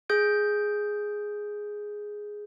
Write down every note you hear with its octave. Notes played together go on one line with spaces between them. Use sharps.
G#4 G6 D7